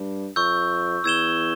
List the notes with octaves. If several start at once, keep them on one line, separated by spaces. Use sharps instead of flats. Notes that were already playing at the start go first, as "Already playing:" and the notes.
Already playing: G2
F2 C#6 E6 G6
E2 E6 G#6 E7 G7